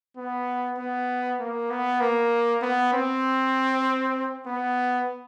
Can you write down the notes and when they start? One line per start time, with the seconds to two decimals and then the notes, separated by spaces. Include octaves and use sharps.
0.17 B3
0.78 B3
1.40 A#3
1.70 B3
2.01 A#3
2.62 B3
2.93 C4
4.46 B3